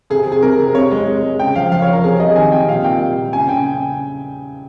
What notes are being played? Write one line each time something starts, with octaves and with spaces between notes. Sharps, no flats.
C3 G#4
C3
G#4
C3 A#4
C3
C3 C#5
G#3
G#3
G#3
C#3 G5
F3 F5
F3 F5
C#5
F3 A#4
C3 G#4
G3 D#5
D#3 G#5
C3 G5
A#2 F5
A#2 G5
G3
A#2
C#3 G#5
C#3 G5